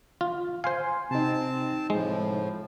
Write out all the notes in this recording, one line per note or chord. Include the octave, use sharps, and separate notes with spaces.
F4
C5 F5 G#5 C6
C3 C4 D#4 A5
A2 F3 G#3